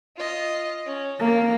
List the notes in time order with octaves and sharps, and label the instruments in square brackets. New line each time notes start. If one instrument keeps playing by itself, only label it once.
[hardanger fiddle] F4 D#5
C#4
[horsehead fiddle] A#3